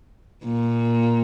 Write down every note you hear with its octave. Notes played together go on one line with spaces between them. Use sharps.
A#2